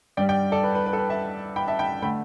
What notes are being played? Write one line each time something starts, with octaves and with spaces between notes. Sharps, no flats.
G2 G3 D5 G5
D5 G5
A4 D5
B4
B4
B4
A4
B4
E5 A5
G5 B5
E5 A5
G5 B5
D3 A3 G5 B5